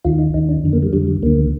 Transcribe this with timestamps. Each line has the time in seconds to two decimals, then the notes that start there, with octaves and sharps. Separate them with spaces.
0.05 D#2 D#3 F4
0.19 D#4
0.34 D#2 D#4
0.38 D#3
0.49 D4
0.64 F2 D3
0.73 A#3
0.82 G3
0.93 F2 D3 G3
1.07 G3
1.23 D2 D3 A#3